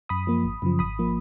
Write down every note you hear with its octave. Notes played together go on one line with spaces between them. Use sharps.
F#2 B5 D#6
F3 A#3
G#1
F#2 C#3 F3
G#1 B5 D#6
F3 A#3